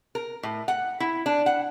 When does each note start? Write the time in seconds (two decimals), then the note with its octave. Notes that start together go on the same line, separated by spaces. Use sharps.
0.15 A#4
0.43 A2
0.68 F#5
1.00 E4
1.26 D4
1.46 F#5